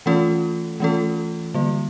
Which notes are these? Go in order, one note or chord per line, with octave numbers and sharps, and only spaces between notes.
E3 A3 C#4 F4 A4
E3 A3 C#4 F4 A4
D3 G3 A#3